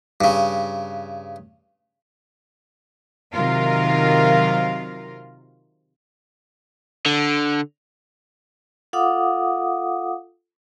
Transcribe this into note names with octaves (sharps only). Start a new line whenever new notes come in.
G2 C#3
C3 D#3 F#3 F4 A#4 F5
D3
F4 A4 F5 F#5 D6 D#6